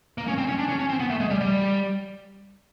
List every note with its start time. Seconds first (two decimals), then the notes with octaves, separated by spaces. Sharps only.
0.18 A#3
0.28 C#4
0.38 C4
0.48 C#4
0.59 D4
0.69 C#4
0.79 C#4
0.89 C4
1.00 B3
1.10 A3
1.20 G#3
1.30 G3
1.41 G3